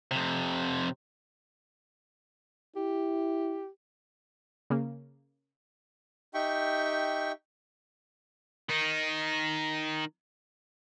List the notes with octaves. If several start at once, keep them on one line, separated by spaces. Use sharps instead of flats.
F2 C3
E4 G4
C#3 A#3
D#4 G4 E5 G5 C#6
D#3 D#4